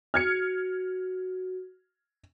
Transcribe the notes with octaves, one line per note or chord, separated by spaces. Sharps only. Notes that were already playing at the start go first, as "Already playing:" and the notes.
F#4 F6 G#6 C#7